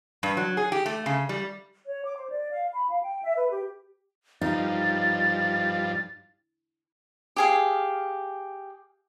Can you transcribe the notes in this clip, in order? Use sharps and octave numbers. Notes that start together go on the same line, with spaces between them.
G2
F#3
G#4
G4
A3
C#3
G3
C#5
D6
C5
D5
F5
B5
F5
G5
E5
B4
G4
G2 F3 D#4 A6
G4 G#4 F5